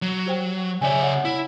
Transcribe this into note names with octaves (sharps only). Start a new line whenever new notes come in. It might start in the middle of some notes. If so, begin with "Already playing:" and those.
F#3
G4 C5 G5
C#3 C#5 D5 E5 G#5
C#5 F#5
E4